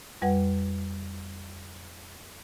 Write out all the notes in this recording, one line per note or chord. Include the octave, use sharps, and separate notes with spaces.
F2 G3 B4 F#5